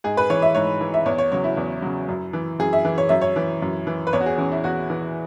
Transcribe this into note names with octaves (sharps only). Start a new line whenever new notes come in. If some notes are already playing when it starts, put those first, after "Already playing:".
G#2 G#4
B4
E3 C#5
E5
G#2 C#5
E3
E5
E2 C#5
C#5
C#3 F#3 C#5
E4
E2
C#3 F#3
F#2
E3
F#2 G#4
E5
E3
C#5
F#2 E5
C#5
E3
F#2
E3
B4
E2 C#5
F#4
G#4
E3 C#4
E4
E2 F#4
E3